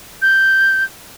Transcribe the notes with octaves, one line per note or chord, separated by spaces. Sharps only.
G6